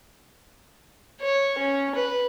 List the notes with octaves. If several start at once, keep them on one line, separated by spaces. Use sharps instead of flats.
C#5
C#4
B4